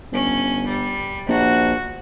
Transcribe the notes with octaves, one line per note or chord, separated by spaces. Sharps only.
G1 C#4
G3
A#1 F#4